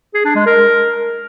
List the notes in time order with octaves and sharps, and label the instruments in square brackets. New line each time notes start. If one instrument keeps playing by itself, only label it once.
[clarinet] G#4
D4
G#3
A#4